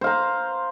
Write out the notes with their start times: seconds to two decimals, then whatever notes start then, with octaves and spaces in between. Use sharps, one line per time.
0.01 C5
0.04 F5
0.07 A#5